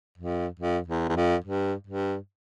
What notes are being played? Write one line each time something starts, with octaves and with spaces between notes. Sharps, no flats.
F2
F2
E2
E2
F2
G2
G2